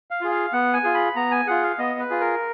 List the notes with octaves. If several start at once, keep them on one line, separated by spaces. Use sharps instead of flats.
F5
F4 G#4
F5
B3 F#5
G#5
F4 G#4
B5
B3 A#5
G#5
F4 G#4 F#5
F5
B3 D#5
B4
F4 G#4
A#4